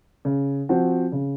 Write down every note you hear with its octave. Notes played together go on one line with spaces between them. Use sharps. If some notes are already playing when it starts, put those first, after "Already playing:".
C#3
F3 C4 F#4 C5
C#3